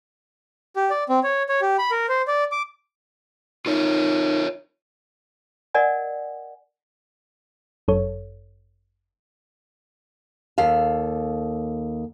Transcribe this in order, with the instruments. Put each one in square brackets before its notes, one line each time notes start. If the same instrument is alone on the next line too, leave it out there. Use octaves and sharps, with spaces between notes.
[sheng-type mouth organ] G4
D5
C4
C#5
C#5
G4
B5
A#4
C5
D5
D6
[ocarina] D#4 [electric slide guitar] F4 A#4 C#5
[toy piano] A#4 D5 D#5 F#5 G#5
[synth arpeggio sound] G1 F#2 A4 C#5
[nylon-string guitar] D#2 A4 F5